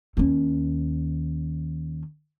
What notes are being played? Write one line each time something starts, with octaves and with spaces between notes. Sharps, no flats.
D#2 C#4